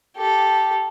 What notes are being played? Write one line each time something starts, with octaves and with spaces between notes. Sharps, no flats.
G4 A4